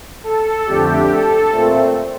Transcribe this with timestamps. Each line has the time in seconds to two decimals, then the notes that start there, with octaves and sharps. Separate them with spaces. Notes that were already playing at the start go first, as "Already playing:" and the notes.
0.24 A4
0.66 F2 D3 A3 D4 G4
1.09 A4
1.51 A#2 A3 C4